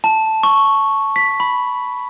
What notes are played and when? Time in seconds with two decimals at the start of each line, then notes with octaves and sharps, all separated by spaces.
0.04 A5
0.43 C#6
1.16 B6
1.40 B5